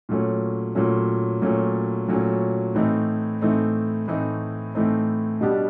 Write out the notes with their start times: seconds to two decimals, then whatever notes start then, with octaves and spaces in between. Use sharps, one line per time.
0.09 A#2 F#3 A3 C#4
0.75 A#2 F#3 A3 C#4
1.42 A#2 F#3 A3 C#4
2.08 A#2 F#3 A3 C#4
2.75 A2 E3 A3 C4 D#4
3.41 A2 E3 A3 C4 D#4
4.07 A2 E3 A3 C4 D#4
4.74 A2 E3 A3 C4 D#4
5.41 B2 G3 B3 D4 G4